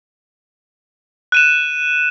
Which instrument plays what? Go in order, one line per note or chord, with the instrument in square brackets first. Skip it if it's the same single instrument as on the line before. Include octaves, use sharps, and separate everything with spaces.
[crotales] F#6 D#7 E7